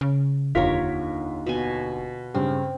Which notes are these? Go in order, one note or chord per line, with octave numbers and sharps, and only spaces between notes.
C#3
F1 D#2 D3 F4 A#4 C#5 B6
B2 G#5
G2 C#3 C4